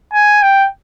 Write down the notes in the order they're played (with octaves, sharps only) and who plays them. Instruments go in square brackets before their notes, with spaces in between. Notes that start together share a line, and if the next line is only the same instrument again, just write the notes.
[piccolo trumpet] G#5
G5